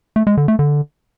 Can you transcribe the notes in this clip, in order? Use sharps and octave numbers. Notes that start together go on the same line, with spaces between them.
A3
G#3
D3
A3
D3